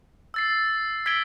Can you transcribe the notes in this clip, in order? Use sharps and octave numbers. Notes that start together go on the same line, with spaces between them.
E6 A6 C7
E6 G#6 B6 D7 G7